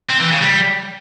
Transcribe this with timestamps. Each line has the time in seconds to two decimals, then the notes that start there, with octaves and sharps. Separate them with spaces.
0.10 C4
0.20 E3
0.31 C#3
0.41 G3